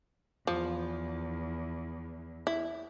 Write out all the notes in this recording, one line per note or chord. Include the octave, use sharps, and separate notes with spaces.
E2 F3
E4